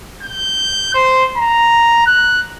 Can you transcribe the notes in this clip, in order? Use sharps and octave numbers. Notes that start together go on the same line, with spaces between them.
G6
C5
A#5
F#6